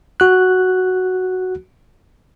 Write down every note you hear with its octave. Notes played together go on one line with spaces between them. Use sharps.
F#4 F#6